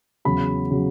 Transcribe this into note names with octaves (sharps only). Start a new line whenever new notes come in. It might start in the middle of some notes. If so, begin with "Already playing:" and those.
E2 C#3 F#3 B5
C#3 F#3